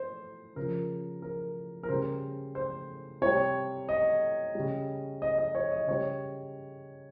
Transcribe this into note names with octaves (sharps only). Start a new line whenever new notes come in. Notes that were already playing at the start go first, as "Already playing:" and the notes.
Already playing: C5
C#3 F3 A#4
A#4
A#4
C#3 G3 C5
C5
C3 G3 C#5
D#5
C#3 G3
D#5
D#5
C#5
D#5
C#3 G3 C#5